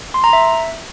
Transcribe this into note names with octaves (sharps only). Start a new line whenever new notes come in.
C6
A#5
E5